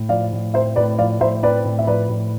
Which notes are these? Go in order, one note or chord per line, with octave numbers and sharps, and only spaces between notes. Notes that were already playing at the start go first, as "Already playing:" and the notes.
Already playing: A2
F3 D5 F5
A2
C4 C5 E5
A2 B4 D5
F3 D5 F5
A2 C5 E5
C4 B4 D5
A2
E5
F3 B4 D5
A2